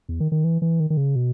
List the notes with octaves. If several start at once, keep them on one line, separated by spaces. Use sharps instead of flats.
E2
D#3
D#3
E3
E3
D#3
D#3
C#3
B2